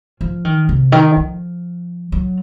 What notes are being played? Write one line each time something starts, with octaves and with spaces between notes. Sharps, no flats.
F3
D#3
C3
D#3
F3
F#3